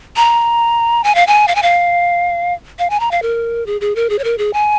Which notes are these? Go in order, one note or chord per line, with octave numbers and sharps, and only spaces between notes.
A#5
G#5
F5
G#5
F5
G#5
F5
F5
G#5
A#5
F5
A#4
G#4
G#4
A#4
G#4
C#5
A#4
G#4
G#5